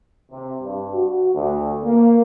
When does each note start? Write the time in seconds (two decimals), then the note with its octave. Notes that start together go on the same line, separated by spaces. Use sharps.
0.32 C3
0.63 G2
0.94 F#4
1.35 D2
1.84 A#3